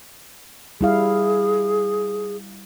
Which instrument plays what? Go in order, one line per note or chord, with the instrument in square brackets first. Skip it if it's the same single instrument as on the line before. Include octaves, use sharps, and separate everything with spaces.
[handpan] G3 E4 F5 [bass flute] G#4